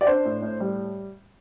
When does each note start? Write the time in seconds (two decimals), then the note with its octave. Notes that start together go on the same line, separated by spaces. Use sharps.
0.01 D5
0.07 D4 C5
0.25 A2
0.42 A2
0.60 G3